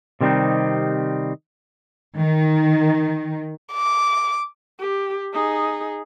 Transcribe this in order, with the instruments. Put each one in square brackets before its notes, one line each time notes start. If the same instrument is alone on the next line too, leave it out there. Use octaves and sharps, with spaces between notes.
[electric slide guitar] C3 D#3 G3 C4 D#4
[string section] D#3
[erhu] D6
[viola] G4
D#4 G#4